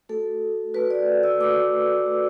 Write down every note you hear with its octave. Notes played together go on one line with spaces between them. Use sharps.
A3 F#4 A4
A3 F#4 B4
D5
E6
A3 F#4 D6
A3 F#4